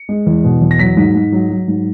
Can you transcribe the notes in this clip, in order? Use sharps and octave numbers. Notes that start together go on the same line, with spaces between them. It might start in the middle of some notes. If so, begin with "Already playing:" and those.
Already playing: C#7
G#3
E2
B2
E2
A#6
F#3 B6
G#2
G#2
F#3
F#3
G#2